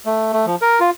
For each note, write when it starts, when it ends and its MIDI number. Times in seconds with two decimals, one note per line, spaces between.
0.06 0.33 57
0.33 0.46 57
0.46 0.56 53
0.62 0.80 70
0.80 0.90 65